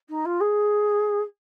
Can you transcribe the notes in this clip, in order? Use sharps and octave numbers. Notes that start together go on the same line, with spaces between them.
D#4
F4
G#4